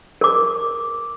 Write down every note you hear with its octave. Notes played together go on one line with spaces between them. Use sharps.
A#4 D6